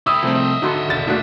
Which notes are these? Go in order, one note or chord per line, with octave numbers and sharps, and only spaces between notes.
E4 G4 D#6 E6
C2 F3 A3 C4
D#5 E5
G#1 D3 D#4 F#4 A4 C6
E1 A6
A3 A#3 D4 E4 F#4